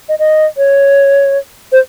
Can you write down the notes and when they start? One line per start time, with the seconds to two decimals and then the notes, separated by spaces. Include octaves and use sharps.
0.09 D#5
0.19 D#5
0.57 C#5
1.72 C5